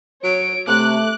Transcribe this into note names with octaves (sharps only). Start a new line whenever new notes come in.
F#3 C#5 D7
C3 A3 D6 F#6